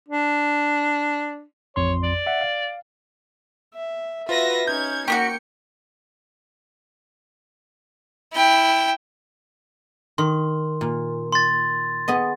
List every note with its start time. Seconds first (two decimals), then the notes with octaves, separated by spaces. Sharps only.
0.09 D4
1.76 A1 F2 C#5 C6
2.03 D5
2.26 E5 F#5
2.41 F5
3.75 E5
4.29 F4 F#4 B4 E5 A#6
4.68 C#4 D#4 G6 G#6
5.08 A#3 C#4 D4 F#4 G5 C#7
8.34 E4 G5
10.18 D#3 C6
10.81 A#2
11.32 C6 A6
12.08 B3 G#4 D#5